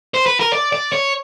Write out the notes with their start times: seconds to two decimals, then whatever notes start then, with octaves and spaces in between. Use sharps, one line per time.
0.14 C5
0.26 B4
0.40 A#4
0.53 D5
0.73 D5
0.93 C#5